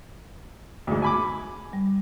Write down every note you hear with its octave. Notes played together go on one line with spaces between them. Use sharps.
D2 G#2
G#5 B5 D6
G3